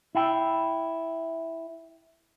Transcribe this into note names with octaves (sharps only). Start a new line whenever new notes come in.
E4 G5